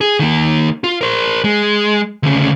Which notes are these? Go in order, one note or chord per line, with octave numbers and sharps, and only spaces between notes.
G#4
D#3 A#3
F4
A#4 C5
G#3
D2 C#3